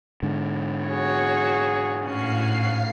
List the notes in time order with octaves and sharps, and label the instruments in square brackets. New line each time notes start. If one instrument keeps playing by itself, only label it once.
[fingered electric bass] G#2 D3
[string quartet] F#4 C#5 [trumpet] G#4
[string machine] A2 F5 C7 [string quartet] C#4 F#4